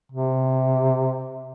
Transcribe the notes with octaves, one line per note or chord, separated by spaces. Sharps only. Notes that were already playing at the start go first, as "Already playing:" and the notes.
C3